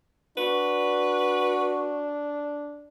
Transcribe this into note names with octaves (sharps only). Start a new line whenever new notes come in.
D4 F#4 B4